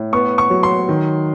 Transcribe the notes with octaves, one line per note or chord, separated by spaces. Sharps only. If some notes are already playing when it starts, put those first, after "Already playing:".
Already playing: A2
B3 C#6
C#6
F#3
C6
D#3